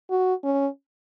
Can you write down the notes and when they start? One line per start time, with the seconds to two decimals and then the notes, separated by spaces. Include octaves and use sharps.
0.11 F#4
0.44 C#4